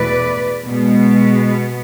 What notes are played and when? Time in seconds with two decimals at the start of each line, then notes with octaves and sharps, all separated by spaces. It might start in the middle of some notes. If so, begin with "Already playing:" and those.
Already playing: E2 B2 A3 B4 D5
0.66 B2 G#3 B3